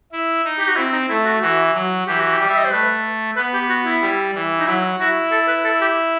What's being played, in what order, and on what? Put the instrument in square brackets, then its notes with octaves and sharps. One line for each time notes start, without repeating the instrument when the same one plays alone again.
[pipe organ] E4
D#4
[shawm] G4
F#4
[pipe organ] C4 [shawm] E4
[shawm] D#4
[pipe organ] A3 [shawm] E4
[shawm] F#4
[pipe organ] E3 [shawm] F#4
[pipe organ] F#3
[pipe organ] E3 [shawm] G4
[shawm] F#4
G4
[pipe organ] G3
[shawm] E5
D#5
C5
[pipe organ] A3 [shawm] B4
[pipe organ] B3 [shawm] B4
[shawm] G4
F#4
E4
[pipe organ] G3
E3
[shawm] D#4
[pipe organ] F#3 [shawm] E4
[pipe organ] E4 [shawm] F#4
[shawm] A4
B4
A4
G4